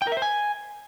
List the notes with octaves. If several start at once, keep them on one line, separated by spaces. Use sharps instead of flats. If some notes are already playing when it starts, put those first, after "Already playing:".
G5
A#4
E5
C5
G#5